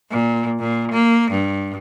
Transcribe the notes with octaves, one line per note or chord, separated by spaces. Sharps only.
A#2
A#2
A#3
G2